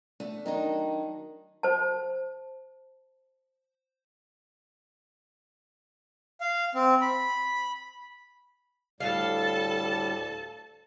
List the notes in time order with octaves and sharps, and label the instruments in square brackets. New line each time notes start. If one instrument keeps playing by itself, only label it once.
[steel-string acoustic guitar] A3 D4
[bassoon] D#3 [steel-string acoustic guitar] F#3 D4 D#4
[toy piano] C5 A5
[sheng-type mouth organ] F5
C4
B5
[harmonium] D2 A2 G3 [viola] A4 A5 [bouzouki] F5